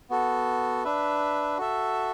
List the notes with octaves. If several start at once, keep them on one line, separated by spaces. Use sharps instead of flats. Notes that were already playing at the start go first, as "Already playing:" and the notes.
B3 F#4 A4
D4 B4 E5
F#4 A4 E5